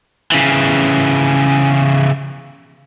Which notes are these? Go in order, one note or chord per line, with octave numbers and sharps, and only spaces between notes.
C#3 E3